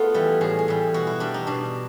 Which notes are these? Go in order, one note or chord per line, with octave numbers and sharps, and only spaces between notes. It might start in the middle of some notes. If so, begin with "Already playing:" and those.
Already playing: A3 B3 F4
E3 G3
A2 G#4
G#4
E3 G3
B2 F#4
E4
G3 D4
D#4
B2 D4